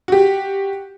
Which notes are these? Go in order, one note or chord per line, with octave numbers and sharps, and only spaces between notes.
F#4 G4